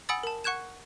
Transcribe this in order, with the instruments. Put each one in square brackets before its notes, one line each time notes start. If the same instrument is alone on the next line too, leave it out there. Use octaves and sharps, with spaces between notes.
[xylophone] F#5 G#5 B5 D#6 E6 A6
A#4 A5
F#5 C#6 F#6 G#6 E7